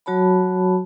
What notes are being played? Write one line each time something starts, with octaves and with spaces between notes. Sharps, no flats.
F#3 F#4 C#5 A5 B5